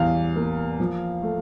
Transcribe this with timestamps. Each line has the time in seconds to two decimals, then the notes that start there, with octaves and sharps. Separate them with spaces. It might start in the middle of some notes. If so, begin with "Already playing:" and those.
Already playing: E2 E3 G3 F5
0.36 A#3
0.80 F3
1.22 A3